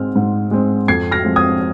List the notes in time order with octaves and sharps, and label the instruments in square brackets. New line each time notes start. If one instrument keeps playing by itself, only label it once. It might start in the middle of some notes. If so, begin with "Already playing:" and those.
Already playing: [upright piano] G#2 G#3 C4 F6
G#2
G#3 C4
F2 G#6 C7
F6 A#6
F3 G#3 C4
D#6 G#6